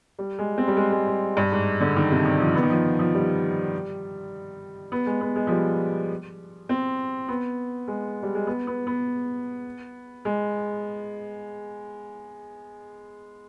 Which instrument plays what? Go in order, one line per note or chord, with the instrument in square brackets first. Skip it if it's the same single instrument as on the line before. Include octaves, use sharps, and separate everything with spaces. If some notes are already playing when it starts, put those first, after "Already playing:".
[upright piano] G3
G#3
C4
G3
G#3
G#3
G3
G2
G#2
D3
D#3
C3
D#3
F3
B3
D#3
F3
F3
G3
B3
G#3
B3
G#3
F3
G3
C4
B3
G#3
G3
G#3
B3
B3
B3
G#3